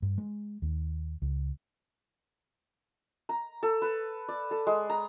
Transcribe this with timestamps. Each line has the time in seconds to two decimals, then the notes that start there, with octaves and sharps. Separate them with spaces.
0.02 G2
0.18 G#3
0.62 D#2
1.22 C#2
3.29 A#5
3.63 A4
3.82 B4
4.29 D5
4.51 A4
4.67 G#3
4.90 A#5